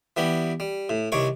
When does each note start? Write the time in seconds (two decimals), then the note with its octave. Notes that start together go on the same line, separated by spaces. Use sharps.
0.17 E3 G3 B3 G4
0.60 G3
0.89 A2
1.12 C2 D#3 C#5 C#6 D6